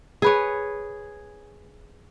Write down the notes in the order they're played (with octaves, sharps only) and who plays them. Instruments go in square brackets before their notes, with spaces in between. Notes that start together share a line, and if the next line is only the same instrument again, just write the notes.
[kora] G#4 B4 C#5